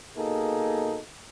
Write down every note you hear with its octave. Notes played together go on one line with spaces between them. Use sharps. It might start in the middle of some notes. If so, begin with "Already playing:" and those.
B2 A#3 D#4 G#4 A4